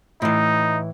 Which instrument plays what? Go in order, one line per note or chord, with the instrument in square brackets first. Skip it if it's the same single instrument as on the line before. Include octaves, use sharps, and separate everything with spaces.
[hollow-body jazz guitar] A2 E3 [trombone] D#4